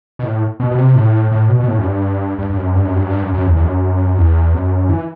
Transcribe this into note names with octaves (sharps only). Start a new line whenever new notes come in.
B2
A2
B2
B2
C3
A2
A2
B2
B2
A2
F#2
G2
G2
G2
F#2
G2
F#2
G2
F#2
G2
F#2
F#2
E2
E2
F#2
E2
F#2
E3